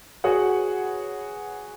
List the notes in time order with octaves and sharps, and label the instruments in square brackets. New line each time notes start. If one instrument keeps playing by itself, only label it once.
[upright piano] F#4 G#4 B4 C#5 F#5